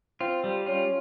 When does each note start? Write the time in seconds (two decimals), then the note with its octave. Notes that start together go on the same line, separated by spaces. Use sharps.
0.20 C4 F4
0.44 G3
0.66 C#4 F4